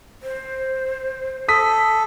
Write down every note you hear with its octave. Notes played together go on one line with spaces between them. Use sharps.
C5
A4 D#6 B6